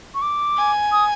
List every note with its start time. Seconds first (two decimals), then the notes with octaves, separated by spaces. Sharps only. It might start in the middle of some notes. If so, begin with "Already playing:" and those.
0.15 C#6
0.22 D6
0.57 G#5
0.92 D#6